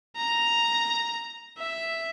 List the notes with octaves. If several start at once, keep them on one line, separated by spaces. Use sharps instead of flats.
A#5
E5